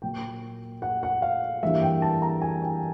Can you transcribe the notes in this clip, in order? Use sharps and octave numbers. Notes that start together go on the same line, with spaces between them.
A#2 F#3 A#3 G5
F#5
F#5
F5
G2 E3 G3 A#3 E5
G5
A5
A#5
G#5
G5